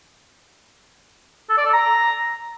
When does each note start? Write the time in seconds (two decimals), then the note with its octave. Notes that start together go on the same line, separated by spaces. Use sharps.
1.50 A4
1.58 D5
1.65 A4
1.73 A#5